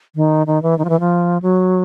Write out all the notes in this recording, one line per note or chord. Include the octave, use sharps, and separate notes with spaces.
D#3
D#3
E3
D#3
F3
E3
F3
F#3